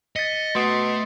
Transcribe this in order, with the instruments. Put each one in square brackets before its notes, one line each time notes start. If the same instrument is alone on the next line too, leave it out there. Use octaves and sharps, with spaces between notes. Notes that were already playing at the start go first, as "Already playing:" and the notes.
[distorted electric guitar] D#5 [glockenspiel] A6 B6 C#7
[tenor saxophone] B2 [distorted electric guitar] A3 [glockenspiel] C6 D#6 C7